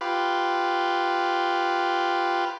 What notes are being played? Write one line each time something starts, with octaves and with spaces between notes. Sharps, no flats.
F4 G4 B4